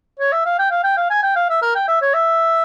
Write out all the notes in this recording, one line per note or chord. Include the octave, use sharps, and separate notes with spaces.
C#5
E5
F5
G5
F5
G5
F5
G#5
G5
F5
E5
A#4
G5
E5
C#5
E5